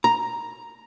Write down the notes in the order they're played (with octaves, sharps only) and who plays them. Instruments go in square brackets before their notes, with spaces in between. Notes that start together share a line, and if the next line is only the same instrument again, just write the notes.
[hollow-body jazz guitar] A#5